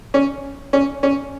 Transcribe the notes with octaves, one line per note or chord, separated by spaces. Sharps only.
C#4
C#4
C#4